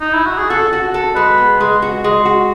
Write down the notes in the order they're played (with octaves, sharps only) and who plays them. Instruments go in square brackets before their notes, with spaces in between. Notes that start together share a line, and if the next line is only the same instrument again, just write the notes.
[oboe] D#4
E4
F#4
G#4
[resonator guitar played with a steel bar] F#4 [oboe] A4
[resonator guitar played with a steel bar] F#4
A4
[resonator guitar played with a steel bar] G#3 [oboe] B4
[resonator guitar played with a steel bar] B3
G#3
F#4
G#3
F#4